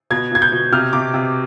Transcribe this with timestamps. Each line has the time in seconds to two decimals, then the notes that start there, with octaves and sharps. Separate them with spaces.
0.10 B2 G#6
0.31 B2 G#6
0.42 G6
0.52 B2
0.72 C3 F6
0.93 C3 D6
1.14 C3